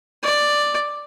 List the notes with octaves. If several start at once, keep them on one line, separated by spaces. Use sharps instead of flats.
D5